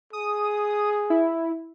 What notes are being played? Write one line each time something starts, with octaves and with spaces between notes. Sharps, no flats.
G#4 D#6
E4